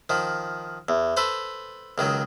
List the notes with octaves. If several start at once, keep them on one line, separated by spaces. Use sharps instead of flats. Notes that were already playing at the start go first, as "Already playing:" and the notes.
D#3 F3
E2
A4 B4 C5
C#2 D#3 F#3